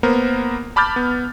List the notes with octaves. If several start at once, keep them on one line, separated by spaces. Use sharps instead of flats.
A#3 B3 A#4 C5
A5 B5 D6 F6 G6 A6
B3